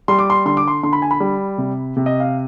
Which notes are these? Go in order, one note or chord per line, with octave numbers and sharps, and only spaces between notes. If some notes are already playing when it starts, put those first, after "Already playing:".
G3 C6
D6
C6
D3 C6
D6
C6
D3 C6
B5
G#5
B5
G3
C3
C3
D#5
F5